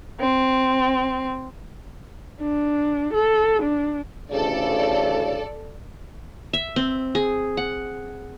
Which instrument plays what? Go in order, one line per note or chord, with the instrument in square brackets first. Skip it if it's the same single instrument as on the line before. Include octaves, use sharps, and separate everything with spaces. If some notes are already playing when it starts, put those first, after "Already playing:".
[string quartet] C4
[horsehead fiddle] D4
A4
D4
[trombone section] A1 D2 C#3 [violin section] A4 D5
[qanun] E5
C4
G#4
F#5